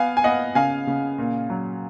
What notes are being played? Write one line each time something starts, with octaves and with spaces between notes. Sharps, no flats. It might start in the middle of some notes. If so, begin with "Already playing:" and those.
Already playing: B3 F5 G#5
G#5
B3 D#5 F#5
C#3 F5 G#5
C#3
A#2
F#3